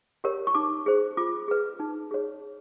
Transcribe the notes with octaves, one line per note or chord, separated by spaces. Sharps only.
G4 A#4 C#5
C#6
D#4 D6
G#4 C5
F4 D6
G#4 B4
D#4
G#4 C#5